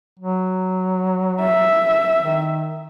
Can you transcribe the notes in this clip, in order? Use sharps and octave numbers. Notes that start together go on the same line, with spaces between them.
F#3
E5
D#3